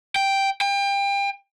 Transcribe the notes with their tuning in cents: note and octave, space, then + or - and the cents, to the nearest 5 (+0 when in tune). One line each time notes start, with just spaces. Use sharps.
G5 +0
G5 +30